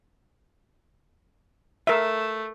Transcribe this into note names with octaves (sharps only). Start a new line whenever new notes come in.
A3 A#4 E5